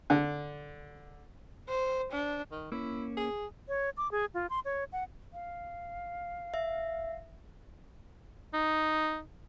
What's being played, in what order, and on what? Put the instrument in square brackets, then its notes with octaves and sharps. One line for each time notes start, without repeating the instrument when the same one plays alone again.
[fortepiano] D3
[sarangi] C5
D4
[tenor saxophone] D#3
[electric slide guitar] A#3 C#4 [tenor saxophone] E4
[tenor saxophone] G#4
[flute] C#5
D6
G#4
F4
C6
C#5
F#5
[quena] F5
[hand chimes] E5
[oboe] D#4